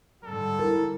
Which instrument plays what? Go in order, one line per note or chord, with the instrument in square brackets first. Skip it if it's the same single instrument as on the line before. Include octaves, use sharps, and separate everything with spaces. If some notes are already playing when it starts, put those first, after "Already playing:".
[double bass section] G#2 D3 G3 [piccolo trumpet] A4
[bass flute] E4 [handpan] A#4